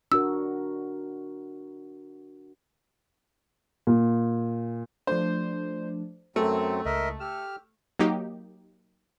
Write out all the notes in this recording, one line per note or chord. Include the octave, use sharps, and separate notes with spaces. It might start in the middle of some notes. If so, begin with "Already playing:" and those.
D4 F#4 A#4 E6
A#2
F3 A3 D4 C5
F#2 F#3 A3 C4 A#4
C#2 A#4 D#5 E5
G4 E6 F6
F#3 A#3 D#4 G4